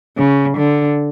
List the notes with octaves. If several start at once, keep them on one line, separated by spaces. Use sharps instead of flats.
C#3
D3